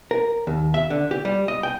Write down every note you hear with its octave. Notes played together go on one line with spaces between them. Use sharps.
A#4
D#2
E5
D3
G4
G3
D#5
G5